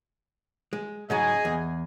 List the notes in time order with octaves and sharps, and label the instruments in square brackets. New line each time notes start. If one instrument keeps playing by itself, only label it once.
[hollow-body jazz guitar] G#3
[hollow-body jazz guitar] G#2 C#3 F#3 [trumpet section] G#4 D#5 G#5
[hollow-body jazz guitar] E2